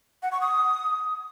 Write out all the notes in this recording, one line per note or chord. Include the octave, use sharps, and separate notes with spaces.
F#5
C#6
D#6